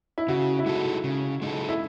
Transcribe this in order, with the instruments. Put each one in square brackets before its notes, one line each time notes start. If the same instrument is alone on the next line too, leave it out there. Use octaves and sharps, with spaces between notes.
[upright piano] E4
[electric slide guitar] C#3 [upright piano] F#4
[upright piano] E4
[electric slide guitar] G#3 D#4 A4 [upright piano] F#4
[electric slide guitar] C#3
G#3 D#4 A4
[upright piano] E4